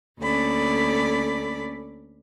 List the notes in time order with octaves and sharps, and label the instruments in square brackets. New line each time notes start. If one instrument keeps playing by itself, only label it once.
[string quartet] D2 A#3 C#4 A4 D5 B5